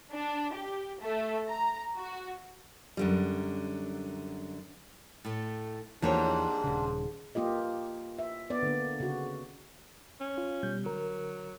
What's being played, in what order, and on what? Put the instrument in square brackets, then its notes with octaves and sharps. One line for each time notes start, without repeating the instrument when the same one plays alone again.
[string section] D4
G4
A3
A#5
F#4
[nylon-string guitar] F#2 D3 G3
A2 A3
[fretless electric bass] E2 E3 F3 [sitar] G#2 [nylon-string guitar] A#3 G4 C#5 [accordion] D4
[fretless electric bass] D#1 C#3
[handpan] A#3 F4 G4 D#5
E5
B3 D5
D3 A#3
C#3 F#4
[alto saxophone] C#4
[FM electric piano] F4
B2 G3 G6
[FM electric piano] D3 A#4 [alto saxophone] F#3